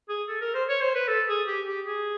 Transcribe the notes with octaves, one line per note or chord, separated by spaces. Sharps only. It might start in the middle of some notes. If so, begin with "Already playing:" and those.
G#4
A4
A#4
C5
C#5
C5
B4
A4
G#4
G4
G4
G#4